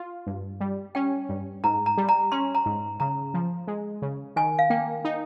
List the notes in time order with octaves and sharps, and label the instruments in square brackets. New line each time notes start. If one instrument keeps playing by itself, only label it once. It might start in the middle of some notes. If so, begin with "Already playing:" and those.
Already playing: [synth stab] F4
G2
G3
[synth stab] C#4 [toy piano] G5
[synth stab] G2
[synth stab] G#2 [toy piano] A#5
[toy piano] A#5
[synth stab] G3
[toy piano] A#5
[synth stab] C#4 [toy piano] C6
[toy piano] A#5
[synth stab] G#2
[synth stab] C#3 [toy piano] A#5
[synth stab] F3
G#3
C#3
[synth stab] D#3 [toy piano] G#5
[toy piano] F5
[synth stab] A#3 [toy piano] G5
[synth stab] D#4